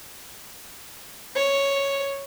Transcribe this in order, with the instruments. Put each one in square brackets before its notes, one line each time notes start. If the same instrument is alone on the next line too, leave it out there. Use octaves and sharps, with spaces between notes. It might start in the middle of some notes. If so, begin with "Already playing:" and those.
[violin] C#5